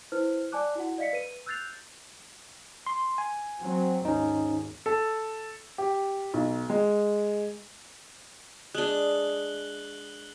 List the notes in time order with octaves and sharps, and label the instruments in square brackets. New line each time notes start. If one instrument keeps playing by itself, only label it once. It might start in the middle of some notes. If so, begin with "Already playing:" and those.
[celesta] E4 B4 C5 F6
D5 G#5 A5 D6 F#6
E4 F#4 F#5
D5 D#5 F5 B6 C#7
B4 D#7
E6 F#6 G6 A6 C7 F7
[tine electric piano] C6
G#5
[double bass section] F#3 C4
[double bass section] G#1 D#2 [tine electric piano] C#4 D#4
[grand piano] A4
G4
B1
G#3
[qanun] G#3 D4 [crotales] F#6 F#7 G7